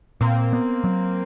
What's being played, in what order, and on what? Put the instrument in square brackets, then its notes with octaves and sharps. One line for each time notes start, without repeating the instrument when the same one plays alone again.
[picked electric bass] A#2 [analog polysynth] A#3 C4
[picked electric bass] B3
F#3